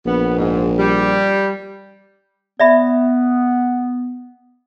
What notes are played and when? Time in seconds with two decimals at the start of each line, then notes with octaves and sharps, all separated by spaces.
0.05 A#1 B3
0.37 G#2
0.77 G3
2.60 B3 D5 E5 B5